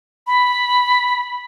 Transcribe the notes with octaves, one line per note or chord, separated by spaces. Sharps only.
B5